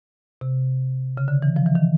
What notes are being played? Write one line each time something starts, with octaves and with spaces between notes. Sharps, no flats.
C3
C#3
D3
E3
F3
E3
D#3